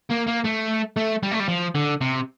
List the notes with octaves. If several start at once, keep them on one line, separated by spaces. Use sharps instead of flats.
A#3
A#3
A3
A3
G3
A3
G3
F3
D3
C3